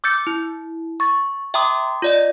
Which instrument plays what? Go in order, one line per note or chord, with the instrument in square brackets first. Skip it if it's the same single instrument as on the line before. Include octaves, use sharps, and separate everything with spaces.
[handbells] D6 E6 G6 A6 C#7
E4
C#6 A6
E5 G5 A#5 C6 D6 D#6
F4 D5 D#5